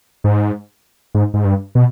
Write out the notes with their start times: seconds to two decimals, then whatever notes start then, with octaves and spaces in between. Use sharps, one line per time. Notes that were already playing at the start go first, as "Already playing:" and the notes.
0.24 G#2
1.15 G#2
1.34 G#2
1.45 G2
1.75 B2